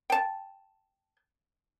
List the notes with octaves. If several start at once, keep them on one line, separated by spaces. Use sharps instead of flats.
G5 A5